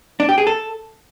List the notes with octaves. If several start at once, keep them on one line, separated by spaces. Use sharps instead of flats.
D4
G4
G#4
A4